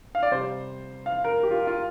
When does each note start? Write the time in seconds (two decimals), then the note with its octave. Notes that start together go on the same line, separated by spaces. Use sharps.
0.15 F5
0.23 D5
0.31 C3 G3 C5
1.06 F5
1.24 A#4
1.43 G4
1.51 F4
1.67 F4